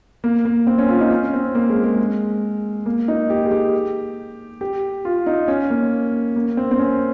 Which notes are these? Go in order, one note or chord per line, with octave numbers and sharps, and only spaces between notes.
A#3
A#3
C4
C#4
F4
D#4
C#4
C4
A#3
G#3
G#3
A#3
D#4
G4
G#4
G4
G4
F4
D#4
C#4
A#3
A#3
C4
C4
C#4